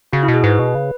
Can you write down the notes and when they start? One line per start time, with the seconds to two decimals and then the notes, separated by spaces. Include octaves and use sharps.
0.13 C#3 F#4
0.23 E4
0.28 B2
0.34 G#4
0.44 G#2 B4
0.59 B2
0.75 C#3